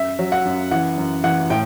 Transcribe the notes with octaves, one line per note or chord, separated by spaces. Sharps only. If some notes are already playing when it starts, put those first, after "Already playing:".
Already playing: F#2 E5
F#3
F#5
F#2
E3 F#5
F#2
E3 F#5
A2 G5